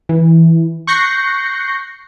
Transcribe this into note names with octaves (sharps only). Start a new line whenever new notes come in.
E3
C#6 F#6 G6 A#6 C7 C#7